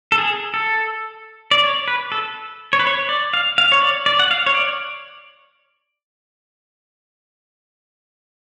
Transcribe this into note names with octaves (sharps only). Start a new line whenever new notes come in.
A4
G#4
A4
D5
C#5
B4
A4
C#5
B4
C#5
D5
F5
F5
C#5
D5
D5
F#5
F5
C#5
D5